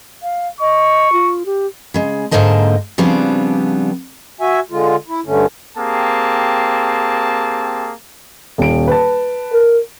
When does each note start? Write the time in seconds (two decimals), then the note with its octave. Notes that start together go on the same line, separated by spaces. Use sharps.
0.23 F5
0.61 D#5 C#6
1.13 F4
1.46 G4
1.94 C#3 G#3
2.31 G#2 D3 A#3 C5 D#5 A5
2.98 C#3 F3 G3 B3 C4 D4
4.41 F#4 E5 G#5
4.71 D3 G#3 F4
5.08 E4
5.26 G2 D3 A3 C#4
5.78 A#3 C4 G4 G#4 A5
8.58 D#1 D7
8.87 B4 A5
9.53 A#4